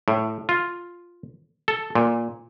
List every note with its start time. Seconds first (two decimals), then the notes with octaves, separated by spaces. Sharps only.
0.08 A2
0.49 F4
1.68 A4
1.95 A#2